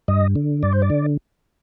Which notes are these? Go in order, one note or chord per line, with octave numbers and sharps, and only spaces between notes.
G2 D#5
D3
G2 D5
C5
D5
D3